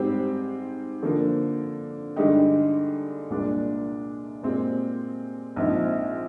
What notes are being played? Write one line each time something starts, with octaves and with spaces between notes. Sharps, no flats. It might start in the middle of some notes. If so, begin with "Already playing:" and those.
Already playing: G#2 G3 C4 G4 C5
D3 F3 A#3
G2 D3 G#3 D#4 G4
C2 A#2 G#3 D4
A#2 G#3 C4 G4
A#1 G#2 F3 C4 D#4